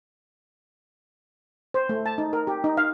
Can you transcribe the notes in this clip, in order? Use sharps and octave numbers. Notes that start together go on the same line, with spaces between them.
C5
A3
A5
D#4
A#4
G4
D#4
F5